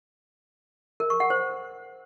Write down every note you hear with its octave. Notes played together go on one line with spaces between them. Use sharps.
A#4
C#6
F#5
C5